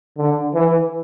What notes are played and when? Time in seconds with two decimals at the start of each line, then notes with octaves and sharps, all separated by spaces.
0.18 D3
0.54 E3